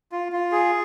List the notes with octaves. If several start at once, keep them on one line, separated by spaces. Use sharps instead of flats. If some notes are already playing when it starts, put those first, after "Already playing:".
F4
F4
G#4